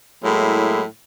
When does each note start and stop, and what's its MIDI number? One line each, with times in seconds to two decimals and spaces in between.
0.23 0.83 45
0.23 0.83 54
0.23 0.83 56
0.23 0.83 58
0.23 0.83 64